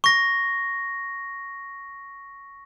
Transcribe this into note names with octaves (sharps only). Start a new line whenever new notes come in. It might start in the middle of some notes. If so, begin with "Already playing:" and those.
C#6 A#6